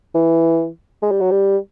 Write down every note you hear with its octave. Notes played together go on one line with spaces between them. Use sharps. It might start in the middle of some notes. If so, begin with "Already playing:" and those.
E3
G#3
G3
F#3
G3